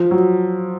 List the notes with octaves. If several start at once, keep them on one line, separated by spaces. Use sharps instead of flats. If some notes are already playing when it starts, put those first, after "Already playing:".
Already playing: F3
F#3